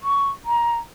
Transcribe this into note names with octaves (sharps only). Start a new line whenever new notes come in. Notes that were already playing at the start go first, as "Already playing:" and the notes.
C#6
A#5